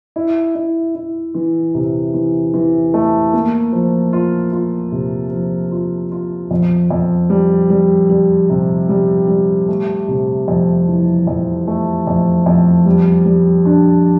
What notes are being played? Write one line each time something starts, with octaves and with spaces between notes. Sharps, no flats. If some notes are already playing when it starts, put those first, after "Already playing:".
E4
E4
E4
E3
C3
E3
E3
A3
A#3
F3
F4
F4
C3
F3
F4
F4
F2
F2
G3
G3
G3
C3
G3
G3
A3
C3
F2
E3
F2
A3
F2
F2
G3
G3
D4